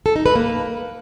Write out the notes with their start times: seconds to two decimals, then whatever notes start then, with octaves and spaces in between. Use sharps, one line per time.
0.06 A4
0.16 D#4
0.26 B4
0.36 A#3